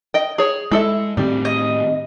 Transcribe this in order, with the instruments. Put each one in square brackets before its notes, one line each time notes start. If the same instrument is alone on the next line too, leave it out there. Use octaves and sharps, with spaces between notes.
[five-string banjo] D#5 G5
G#4 C#5
[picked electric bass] G#3 [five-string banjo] E4 A4 E5
[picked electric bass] A2 D#3 C4 [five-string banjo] G3
[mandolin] D#5